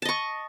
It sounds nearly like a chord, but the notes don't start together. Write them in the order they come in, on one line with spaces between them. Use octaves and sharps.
A5 D#5 C#6